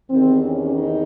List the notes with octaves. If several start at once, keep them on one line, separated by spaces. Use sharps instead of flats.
E2 C3 D#3 C4
C#4
D#4